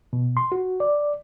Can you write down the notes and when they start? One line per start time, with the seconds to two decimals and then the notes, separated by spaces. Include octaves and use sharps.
0.13 B2
0.37 C6
0.52 F#4
0.80 D5